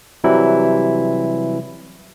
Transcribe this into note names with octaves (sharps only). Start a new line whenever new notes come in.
C3 E3 F#3 G3 E4